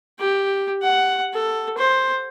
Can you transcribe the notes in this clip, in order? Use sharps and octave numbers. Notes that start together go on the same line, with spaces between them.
G4
F#5
A4
C5